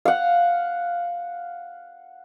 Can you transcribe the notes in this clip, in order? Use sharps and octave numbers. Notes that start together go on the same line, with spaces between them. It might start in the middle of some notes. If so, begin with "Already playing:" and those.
F5 F#5